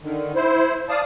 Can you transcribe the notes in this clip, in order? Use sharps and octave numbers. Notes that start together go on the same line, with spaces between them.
D3 D#3
E4 C5
D5 F5 A5 D#6